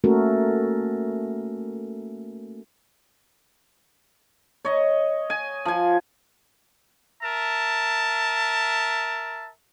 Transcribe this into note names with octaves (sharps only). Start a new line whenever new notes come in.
A3 A#3 C#4 F#4 A4 A#4
C#5 D#5
G#5
F3 G#5
A#4 E5 A5